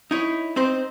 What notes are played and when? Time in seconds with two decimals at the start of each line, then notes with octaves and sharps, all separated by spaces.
0.11 D#4 E4 C#5
0.56 C4 D#4 C5